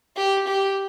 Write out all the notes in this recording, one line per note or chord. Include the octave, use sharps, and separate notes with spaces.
G4
G4